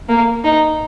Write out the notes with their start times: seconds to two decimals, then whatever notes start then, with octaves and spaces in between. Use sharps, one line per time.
0.09 A#3
0.44 D#4